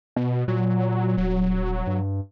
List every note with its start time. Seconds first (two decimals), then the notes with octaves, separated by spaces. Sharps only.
0.16 B2
0.48 A#2 F#3
1.17 D#1 F#3
1.87 G2